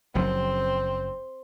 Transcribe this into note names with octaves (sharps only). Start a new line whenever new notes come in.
F#1 F#2 F3 C4